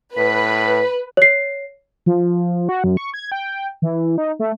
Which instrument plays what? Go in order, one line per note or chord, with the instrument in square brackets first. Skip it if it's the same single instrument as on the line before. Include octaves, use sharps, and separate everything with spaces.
[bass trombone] A2 [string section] B4 [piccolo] B6
[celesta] C#5 C7
[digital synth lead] F3
F#4
F#2
C#6
G#6
G5
E3
D#4
A3